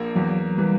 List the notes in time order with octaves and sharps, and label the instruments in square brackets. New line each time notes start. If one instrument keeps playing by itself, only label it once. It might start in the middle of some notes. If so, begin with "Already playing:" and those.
Already playing: [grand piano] A#1 A#3
[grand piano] E2 [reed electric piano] F#3
[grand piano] E3 [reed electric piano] G3